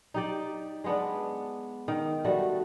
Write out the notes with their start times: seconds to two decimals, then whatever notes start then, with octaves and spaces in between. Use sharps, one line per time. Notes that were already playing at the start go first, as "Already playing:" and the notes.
0.14 D#4 G4 D5
0.84 G#3 B3 D4
1.88 D#3
2.24 G3 A3 F#4